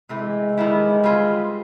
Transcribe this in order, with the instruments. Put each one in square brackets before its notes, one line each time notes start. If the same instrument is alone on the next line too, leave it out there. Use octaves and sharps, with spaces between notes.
[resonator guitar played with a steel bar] C3 E3 A3 [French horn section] G#3
[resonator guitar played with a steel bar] F#2 D#3 G3 B3 E4
G3 C4 F4 G#4 B4